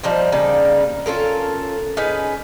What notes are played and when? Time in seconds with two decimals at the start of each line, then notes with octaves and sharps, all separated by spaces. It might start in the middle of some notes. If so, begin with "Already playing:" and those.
0.03 F3 G3 D#4 C5
0.32 C#3 G3 A#3 D#4
1.06 C#4 F4 A4 A#4
1.97 C#4 D#4 G#4 B4